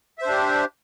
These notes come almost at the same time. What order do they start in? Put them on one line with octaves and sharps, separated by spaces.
E5 C5 D4 G4